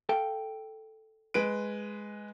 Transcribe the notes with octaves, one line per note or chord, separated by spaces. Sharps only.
A4 F5 G5
G#3 B4 D7